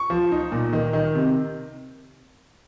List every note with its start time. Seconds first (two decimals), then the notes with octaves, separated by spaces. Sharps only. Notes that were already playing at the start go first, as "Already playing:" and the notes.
Already playing: C#6
0.10 F3
0.32 D#4
0.52 A#2
0.73 D#3
0.93 D#3
1.14 C3